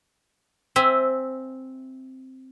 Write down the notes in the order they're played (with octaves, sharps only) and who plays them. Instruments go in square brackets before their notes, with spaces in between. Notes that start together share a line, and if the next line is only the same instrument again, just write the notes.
[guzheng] C4 E5 G#5